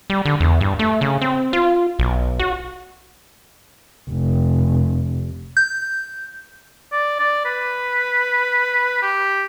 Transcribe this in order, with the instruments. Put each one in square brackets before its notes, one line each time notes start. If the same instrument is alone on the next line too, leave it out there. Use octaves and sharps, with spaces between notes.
[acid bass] G3
D3
E2
G2
A3
C#3
C4
F4
B1
F#4
[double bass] F1
[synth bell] G6
[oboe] D5
D5
B4
G4